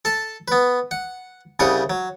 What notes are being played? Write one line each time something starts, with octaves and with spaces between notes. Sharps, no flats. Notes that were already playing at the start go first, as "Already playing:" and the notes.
A4 A5
B3 B4
F#5
C2 C#3 G3 F#5 D#6
F#3